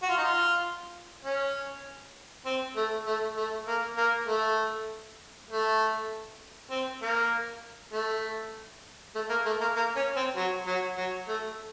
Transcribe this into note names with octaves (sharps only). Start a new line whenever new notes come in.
F#4
F4
D#4
F4
C#4
C4
A3
A3
A3
A#3
A#3
A3
A3
C4
A#3
A3
A3
A#3
A3
A#3
A#3
C#4
C4
F#3
F#3
F#3
A3